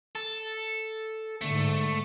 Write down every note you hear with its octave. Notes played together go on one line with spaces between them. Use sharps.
A4
G#2 D3 A3